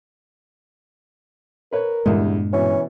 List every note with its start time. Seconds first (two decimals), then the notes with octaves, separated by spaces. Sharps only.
1.73 A#4 B4 C#5
2.06 E2 G2 A#2 D3 G3 G#3
2.53 B2 E3 C#4